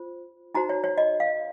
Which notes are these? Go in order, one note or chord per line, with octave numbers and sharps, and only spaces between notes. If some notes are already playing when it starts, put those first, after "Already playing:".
Already playing: F4 C5
D#4 F#4 C5 A#5
C#5
C#5
D#5
F5